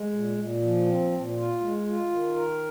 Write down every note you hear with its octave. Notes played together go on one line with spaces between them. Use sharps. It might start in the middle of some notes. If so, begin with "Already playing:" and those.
Already playing: G#3
A#2
A#2
F3
C4
A#2
F4
G#3
F4
D#3
A#4